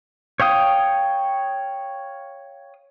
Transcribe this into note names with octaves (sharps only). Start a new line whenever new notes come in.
C#5 F5 G5 D#6